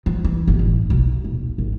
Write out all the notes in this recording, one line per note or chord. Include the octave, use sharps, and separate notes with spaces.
F3
E3
G1
A1
B1
D#1
G#1